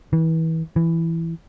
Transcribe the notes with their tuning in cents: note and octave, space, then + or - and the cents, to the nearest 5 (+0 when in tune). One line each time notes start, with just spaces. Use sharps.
E3 -30
E3 +5